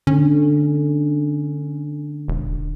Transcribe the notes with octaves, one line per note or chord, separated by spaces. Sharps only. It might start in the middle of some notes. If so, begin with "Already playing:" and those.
D3 C#4
E1